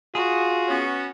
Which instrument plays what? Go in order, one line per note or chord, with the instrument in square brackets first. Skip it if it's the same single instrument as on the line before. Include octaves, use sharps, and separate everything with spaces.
[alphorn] F4 [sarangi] F#4 [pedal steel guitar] G#4
[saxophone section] B3 C#4